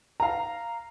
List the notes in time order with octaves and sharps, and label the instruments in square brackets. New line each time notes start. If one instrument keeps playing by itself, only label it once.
[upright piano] F5 A#5